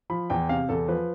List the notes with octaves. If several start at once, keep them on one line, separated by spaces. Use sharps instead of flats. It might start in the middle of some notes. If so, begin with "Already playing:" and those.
F3 B5
E2 G5
C3 F5
E2 A4
F3 B4